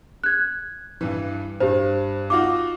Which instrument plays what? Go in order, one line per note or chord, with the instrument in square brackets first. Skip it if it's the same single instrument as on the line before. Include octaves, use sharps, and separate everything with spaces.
[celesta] F#6 G#6
[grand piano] G2 E3
[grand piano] G2 [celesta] G4 C5
[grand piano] D#4 F4 F#4 [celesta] D6